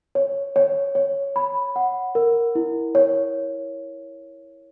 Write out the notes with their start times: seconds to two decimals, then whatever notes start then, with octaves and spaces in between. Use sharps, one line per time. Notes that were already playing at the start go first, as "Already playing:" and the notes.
0.15 C#5
0.56 C#5
0.95 C#5
1.36 B5
1.76 F#5
2.15 A#4
2.55 E4
2.95 C#5